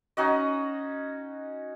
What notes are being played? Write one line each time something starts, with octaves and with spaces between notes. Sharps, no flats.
C#4 D#4 F#4 D#5